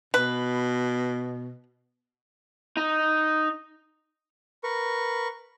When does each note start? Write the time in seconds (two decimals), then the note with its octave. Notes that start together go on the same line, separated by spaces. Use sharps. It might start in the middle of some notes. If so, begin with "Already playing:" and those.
0.14 B2 B4
2.77 D#4
4.63 A#4 B4 C#6